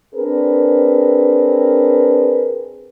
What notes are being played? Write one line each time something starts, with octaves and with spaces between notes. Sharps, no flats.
C4 D4 G#4 A#4 B4